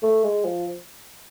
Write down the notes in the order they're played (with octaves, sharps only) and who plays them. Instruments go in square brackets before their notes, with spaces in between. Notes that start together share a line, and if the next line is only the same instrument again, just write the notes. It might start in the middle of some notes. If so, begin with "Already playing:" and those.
[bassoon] A3
G#3
F3